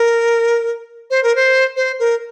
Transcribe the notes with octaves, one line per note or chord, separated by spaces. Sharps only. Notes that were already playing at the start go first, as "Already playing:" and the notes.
Already playing: A#4
C5
A#4
C5
C5
A#4